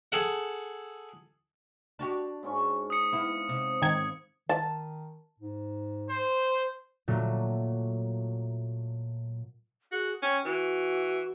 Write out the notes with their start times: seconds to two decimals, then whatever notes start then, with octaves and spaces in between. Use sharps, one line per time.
0.12 G#4 A4 F#5
1.99 D4 F#4 G4
2.43 G#2 C#4 C#6
2.90 D#6 C#7
3.13 B3 E4 F5
3.49 C3
3.82 G#2 D#3 G#6
4.49 D#3 A5
5.40 G#2
6.10 C5
7.08 A#2 F#3 A3
9.92 F#4 G#4
10.22 C#4 G5
10.45 E3 F#4